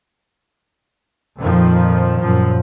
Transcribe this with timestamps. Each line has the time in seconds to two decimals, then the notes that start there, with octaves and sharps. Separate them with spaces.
1.39 F2 A#2 D#3 F3
2.19 F#2 A#2 F3